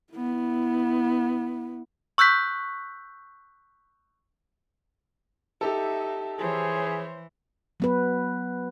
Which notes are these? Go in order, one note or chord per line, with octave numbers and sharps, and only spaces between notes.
B3 E4
C#6 E6 F#6 G6 B6
D#4 G4 A4 E5
E3 G#4 C5 C#5
F#3 B3 B4